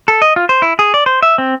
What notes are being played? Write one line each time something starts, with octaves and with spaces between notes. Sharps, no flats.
A4
D#5
F4
C5
E4
G#4
D5
C5
E5
C4